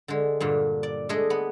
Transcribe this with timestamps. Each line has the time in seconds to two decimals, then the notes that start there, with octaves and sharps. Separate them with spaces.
0.08 D3 G#3
0.40 G2 A#2 D3
0.83 D5
1.09 G#3 A3 D4 G#4 D#5
1.30 B3